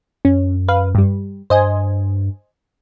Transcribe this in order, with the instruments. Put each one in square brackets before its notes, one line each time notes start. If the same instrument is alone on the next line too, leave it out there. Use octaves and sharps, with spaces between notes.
[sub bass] F#2 [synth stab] C#4
[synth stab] B4 F5
G2 G3
[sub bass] G2 [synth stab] C5 D#5 G#5